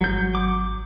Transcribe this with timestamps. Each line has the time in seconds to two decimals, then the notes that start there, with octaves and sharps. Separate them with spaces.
0.01 G#1 F#3 G6
0.35 D6